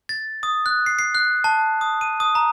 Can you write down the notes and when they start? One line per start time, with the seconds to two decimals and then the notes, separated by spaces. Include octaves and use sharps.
0.09 A6
0.43 D#6
0.66 F#6
0.86 C7
0.99 C7
1.15 F#6
1.44 A5
1.81 D#6
2.01 D#7
2.20 D#6
2.35 A#5